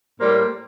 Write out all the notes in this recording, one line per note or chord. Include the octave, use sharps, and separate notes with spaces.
A2 G3 A#3 C5